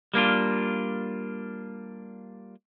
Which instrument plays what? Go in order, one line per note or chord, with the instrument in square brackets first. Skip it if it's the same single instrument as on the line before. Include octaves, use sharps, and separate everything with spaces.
[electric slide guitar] G3 A#3 D4 F4